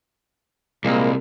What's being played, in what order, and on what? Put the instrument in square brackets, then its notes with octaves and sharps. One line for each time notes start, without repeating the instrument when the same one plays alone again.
[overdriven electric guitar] C2 [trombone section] A#2 G#3 A#3